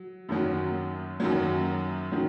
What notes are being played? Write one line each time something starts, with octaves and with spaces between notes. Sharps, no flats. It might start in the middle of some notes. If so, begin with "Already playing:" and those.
Already playing: F#3
F#2 D#3 F#3
F#2 D#3 F#3
D#3 F#3